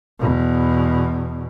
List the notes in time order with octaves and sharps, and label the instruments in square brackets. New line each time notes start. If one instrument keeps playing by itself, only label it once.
[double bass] E2 B2